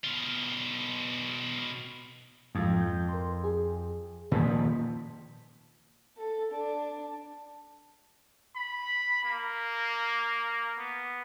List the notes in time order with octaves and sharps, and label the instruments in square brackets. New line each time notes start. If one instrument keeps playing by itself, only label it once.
[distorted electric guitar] B2 F4
[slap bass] F2 [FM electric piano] G#2 F3 F4
[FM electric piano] G6
A#4 C6
G#4
[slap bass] A#2 D#3 F3 [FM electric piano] A#3 A5 B6
[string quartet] A4
D4
[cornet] B5
A#3
B3